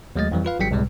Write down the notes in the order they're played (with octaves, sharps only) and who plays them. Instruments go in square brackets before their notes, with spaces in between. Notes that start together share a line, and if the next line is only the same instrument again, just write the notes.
[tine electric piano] D#2 F#3 G#3 A3 D#5 A6
F2 E3 G3
F4 B4 F5
G#1 F#3 G3 G5 B6 C#7
C#2 A2 C3 G3 G#3